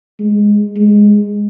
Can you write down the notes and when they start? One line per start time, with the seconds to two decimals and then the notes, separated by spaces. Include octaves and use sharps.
0.19 G#3
0.76 G#3